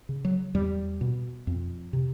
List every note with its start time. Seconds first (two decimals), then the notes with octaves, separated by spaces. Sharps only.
0.09 C#3
0.25 F#3
0.54 E2 G3
1.01 B2
1.47 F2
1.93 C3